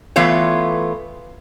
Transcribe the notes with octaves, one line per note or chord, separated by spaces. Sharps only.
E3 A3 B3 F4 C#5